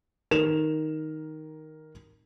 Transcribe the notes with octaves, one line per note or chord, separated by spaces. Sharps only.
D#3 A#4 E7 F7